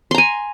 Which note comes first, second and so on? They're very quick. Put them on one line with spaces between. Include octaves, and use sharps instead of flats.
C6 A#5 G#5